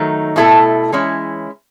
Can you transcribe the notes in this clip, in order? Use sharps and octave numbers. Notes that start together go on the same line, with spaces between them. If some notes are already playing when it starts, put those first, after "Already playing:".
Already playing: D#3 F#3 A3 D#4
B2 A3 E4 A4
E3 G#3 C#4 E4